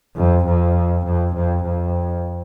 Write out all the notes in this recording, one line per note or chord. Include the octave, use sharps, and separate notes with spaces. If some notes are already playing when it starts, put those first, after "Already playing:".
F2
F2
F2
F2
F2